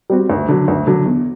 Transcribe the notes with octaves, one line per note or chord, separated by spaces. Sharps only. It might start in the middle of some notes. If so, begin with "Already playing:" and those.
G3 C4 F#4
D2
D3 F#3
D2
D3 F#3
E2